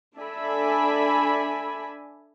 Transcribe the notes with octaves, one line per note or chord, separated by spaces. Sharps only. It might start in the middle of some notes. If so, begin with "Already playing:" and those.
D4 A4 D5 E5 G#5 B5